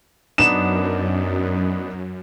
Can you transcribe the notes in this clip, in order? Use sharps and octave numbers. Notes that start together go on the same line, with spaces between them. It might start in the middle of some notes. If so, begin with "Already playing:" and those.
F#2 B3 D4 D#4 E7